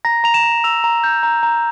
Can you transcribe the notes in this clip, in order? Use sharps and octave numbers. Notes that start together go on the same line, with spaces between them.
A#5 A#6
A#5 F7
E7
A#5
E6 F7
A#5
G6
A#5
A#5